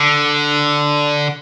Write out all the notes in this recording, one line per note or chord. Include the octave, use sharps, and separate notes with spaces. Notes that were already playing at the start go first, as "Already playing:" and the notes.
Already playing: D3